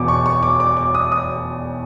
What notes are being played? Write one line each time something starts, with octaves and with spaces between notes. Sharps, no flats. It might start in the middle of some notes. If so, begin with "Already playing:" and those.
Already playing: E1 E2 B2 D6
C#6
C#6
D6
D6
D6
D#6
D#6